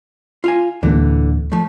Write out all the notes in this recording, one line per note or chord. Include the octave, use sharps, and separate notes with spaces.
F4 F5 G#5
D1 D3 E3 A#3
F3 A3